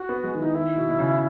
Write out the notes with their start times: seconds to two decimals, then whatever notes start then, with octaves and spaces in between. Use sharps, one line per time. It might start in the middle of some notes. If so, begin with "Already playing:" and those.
Already playing: F#4
0.09 B3
0.24 G#3
0.34 D#3
0.39 E3 D#4
0.54 D#3 E4
0.76 B2
0.88 B2
0.99 C#3